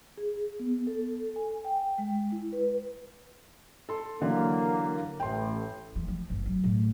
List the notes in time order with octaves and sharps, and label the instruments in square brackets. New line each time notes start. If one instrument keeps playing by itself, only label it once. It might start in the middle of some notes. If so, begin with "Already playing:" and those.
[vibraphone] G#4
B3
A4
G#5
G5
G#3
E4
B4
[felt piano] A4 C6
[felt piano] D3 E3 F#3 [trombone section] A#3
[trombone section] A1 A2 [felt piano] G5 C6
[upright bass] E3
F3
G1
F#3
A2